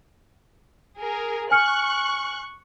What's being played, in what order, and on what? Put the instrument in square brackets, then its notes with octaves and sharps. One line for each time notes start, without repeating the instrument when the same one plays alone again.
[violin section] G#4 A#4
[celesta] G#5 F6 C#7 [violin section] C#6 F#6